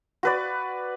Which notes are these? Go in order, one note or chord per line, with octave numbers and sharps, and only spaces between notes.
F#4 B4 D5